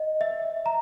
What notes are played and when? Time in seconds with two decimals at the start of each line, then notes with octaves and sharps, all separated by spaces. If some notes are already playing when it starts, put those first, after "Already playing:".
Already playing: D#5
0.21 E5
0.66 A#5